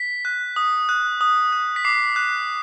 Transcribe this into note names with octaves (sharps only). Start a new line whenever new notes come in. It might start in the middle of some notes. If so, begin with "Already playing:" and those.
Already playing: B6
F#6
D#6
F#6
D#6
F#6
B6
D6 C7
F#6